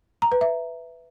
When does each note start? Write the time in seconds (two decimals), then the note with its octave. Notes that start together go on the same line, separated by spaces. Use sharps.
0.22 A#5
0.32 B4
0.41 E5